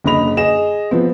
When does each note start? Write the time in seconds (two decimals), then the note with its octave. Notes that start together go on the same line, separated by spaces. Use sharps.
0.04 F#1 D3 D#5 B5 F7
0.37 G#4 D#5 E7
0.91 F3 B3 C4